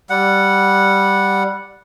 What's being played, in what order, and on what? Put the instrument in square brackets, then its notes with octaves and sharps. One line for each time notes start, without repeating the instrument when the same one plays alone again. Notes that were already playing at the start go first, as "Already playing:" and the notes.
[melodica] G3 F#5